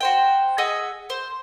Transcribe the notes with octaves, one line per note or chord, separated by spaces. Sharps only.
F#4 C5 G5
G#4 D#5 E5 F#5
C5